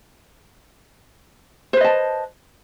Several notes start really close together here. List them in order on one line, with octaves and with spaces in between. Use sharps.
C5 B4 D#5 A5